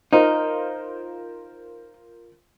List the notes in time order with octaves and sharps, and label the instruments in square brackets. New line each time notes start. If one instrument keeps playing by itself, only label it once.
[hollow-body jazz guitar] D#4 [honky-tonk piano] F4 A#4 C5